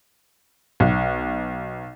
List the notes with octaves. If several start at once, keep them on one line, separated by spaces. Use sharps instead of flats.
B1